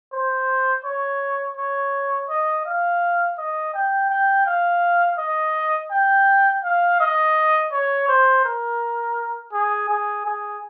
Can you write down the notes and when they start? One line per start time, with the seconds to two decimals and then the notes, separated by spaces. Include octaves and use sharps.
0.12 C5
0.84 C#5
1.57 C#5
2.29 D#5
2.65 F5
3.38 D#5
3.74 G5
4.10 G5
4.46 F5
5.18 D#5
5.91 G5
6.63 F5
7.00 D#5
7.72 C#5
8.08 C5
8.44 A#4
9.52 G#4
9.89 G#4
10.25 G#4